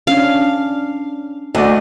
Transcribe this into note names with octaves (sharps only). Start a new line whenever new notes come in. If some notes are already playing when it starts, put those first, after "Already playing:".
C#4 D4 F5
D2 A3 F#4 D5 D#5